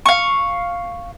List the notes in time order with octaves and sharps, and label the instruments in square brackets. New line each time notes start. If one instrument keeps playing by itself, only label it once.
[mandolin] F5 C#6